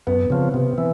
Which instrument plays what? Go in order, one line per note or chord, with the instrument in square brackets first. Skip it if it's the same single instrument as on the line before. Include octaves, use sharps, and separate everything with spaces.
[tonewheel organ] F#2 [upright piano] B3
[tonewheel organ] C#3 F3 [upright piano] C4
[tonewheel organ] C3 [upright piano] B3
[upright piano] C4
[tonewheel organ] E3